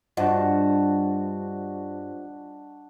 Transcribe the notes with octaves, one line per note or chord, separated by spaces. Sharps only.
G2 D4 F4 F#4 C5 D#5 F#5 A5